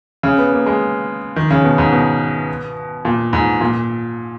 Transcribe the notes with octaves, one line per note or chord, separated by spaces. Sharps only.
C#3
B3
A#3
G#3
D#3
C#3
B2
G#2
B2
A#2
G#2
A#2